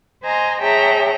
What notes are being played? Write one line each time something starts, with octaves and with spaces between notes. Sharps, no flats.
C5 D#5 G#5 A#5 C6
G#4 C#5 E5 G5 A5 A#5